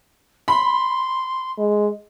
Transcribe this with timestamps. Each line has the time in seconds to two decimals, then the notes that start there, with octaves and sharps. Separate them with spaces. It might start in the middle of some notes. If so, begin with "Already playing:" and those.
0.48 B5 C6
1.58 G#3